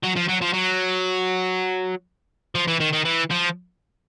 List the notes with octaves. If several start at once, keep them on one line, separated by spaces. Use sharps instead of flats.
F#3
F3
F#3
F3
F#3
F3
E3
D#3
D#3
E3
F3